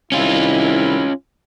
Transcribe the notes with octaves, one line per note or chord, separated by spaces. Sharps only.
C2 D#3 C#4 E4 F4